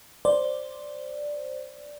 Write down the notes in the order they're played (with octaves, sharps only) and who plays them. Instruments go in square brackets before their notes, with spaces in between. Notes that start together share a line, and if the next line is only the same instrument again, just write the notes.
[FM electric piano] C5 D5